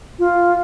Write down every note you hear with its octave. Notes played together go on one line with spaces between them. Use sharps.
F4